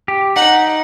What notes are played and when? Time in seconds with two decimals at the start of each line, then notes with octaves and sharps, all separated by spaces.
0.08 G4
0.36 D#4 F#5